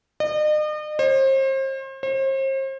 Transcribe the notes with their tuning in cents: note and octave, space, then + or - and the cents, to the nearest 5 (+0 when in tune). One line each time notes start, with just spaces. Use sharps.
D#5 -40
C5 +35
C5 +40